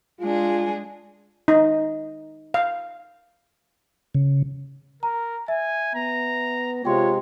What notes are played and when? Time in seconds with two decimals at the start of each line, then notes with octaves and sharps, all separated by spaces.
0.20 G#3 D4 F4 G#4
1.48 D#4
2.54 F5
4.14 C#3
5.03 A#4 A#5
5.48 E5 G#5
5.95 B3 A#5
6.85 C3 G#3 F4 C#5 G5 C6